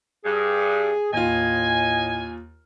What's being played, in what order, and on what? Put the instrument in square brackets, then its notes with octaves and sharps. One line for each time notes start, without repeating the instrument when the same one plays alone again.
[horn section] G2 [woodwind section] G#4
[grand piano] D#2 F4 [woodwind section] A2 D#5 [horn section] G#5